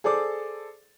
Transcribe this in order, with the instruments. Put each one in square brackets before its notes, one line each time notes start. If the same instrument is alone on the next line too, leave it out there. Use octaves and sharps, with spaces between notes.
[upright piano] G#4 A4 C5 D5 D6